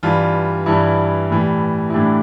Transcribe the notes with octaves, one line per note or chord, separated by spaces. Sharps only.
G2 E3 G3 F4
G2 E3 G3 E4
A2 E3 G3
E4
A2 E3 G3 D4